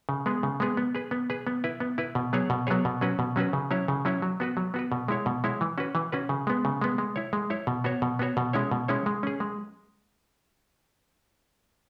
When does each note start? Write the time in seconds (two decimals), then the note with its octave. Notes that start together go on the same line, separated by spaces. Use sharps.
0.09 C#3
0.26 G#3 B3 G#4
0.43 C#3
0.60 G#3 B3 G#4
0.77 B3
0.95 G#4 B4
1.11 B3
1.30 G#4 B4
1.47 B3
1.64 E4 B4
1.80 B3
1.98 E4 B4
2.15 B2
2.33 F#3 B3 G#4 C#5
2.50 B2
2.67 F#3 B3 G#4 C#5
2.85 B2
3.01 F#3 C#4 F#4 B4
3.19 B2
3.36 F#3 C#4 F#4 B4
3.53 C#3
3.71 F#3 C#4 E4 C#5
3.88 C#3
4.05 F#3 C#4 E4 C#5
4.22 F#3
4.40 B3 F#4 B4
4.57 F#3
4.74 B3 F#4 B4
4.92 B2
5.08 G#3 E4 C#5
5.26 B2
5.44 G#3 E4 C#5
5.61 E3
5.78 C#4 F#4 B4
5.95 E3
6.12 C#4 F#4 B4
6.29 C#3
6.47 G#3 B3
6.65 C#3
6.82 G#3 B3
6.98 G#3
7.16 E4 C#5
7.33 G#3
7.50 E4 C#5
7.67 B2
7.84 B3 F#4 C#5
8.02 B2
8.19 B3 F#4 C#5
8.37 B2
8.53 G#3 C#4 E4 C#5
8.71 B2
8.88 G#3 C#4 E4 C#5
9.06 G#3
9.23 C#4 G#4
9.40 G#3